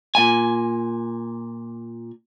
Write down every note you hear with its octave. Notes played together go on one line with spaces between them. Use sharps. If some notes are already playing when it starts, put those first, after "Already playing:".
A#2 G#5